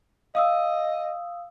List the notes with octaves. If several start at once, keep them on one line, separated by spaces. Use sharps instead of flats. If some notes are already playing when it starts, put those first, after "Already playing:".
D#5 F5 D#6 E6